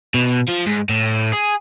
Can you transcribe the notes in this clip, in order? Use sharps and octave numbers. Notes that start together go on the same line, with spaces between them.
B2
F3
G#2
A2
G#4